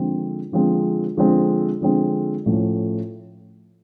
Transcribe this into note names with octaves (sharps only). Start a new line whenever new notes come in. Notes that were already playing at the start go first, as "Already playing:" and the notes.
Already playing: D3 F3 G#3 C4
D3 F3 G#3 C4
D3 F3 G#3 C4
D3 F3 G#3 C4
A2 F3 A3 C#4